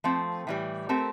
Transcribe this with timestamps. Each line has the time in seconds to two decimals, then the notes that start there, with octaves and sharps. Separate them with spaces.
0.04 F3 A3 C4
0.47 A2 E3 G3
0.89 A3 C4 G4 A#4